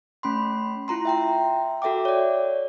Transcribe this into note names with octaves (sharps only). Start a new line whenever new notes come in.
A3 C#4 B5 C6
E4 F4 A#5 C6
E5 G5 A#5
F#4 A4 E5 G5 D6
C#5 D5